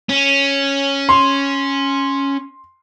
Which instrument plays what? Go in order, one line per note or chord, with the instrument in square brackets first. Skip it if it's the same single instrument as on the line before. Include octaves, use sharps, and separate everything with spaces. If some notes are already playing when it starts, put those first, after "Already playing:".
[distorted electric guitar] C#4
[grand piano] C6